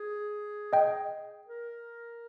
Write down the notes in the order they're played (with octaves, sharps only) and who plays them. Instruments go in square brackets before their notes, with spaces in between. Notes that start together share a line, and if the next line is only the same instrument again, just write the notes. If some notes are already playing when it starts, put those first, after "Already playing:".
Already playing: [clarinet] G#4
[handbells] D#5 G5
[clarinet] A#4